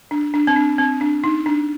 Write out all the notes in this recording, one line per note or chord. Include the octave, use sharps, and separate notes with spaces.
D4
D4
C4
D4
C4
D4
D#4
D4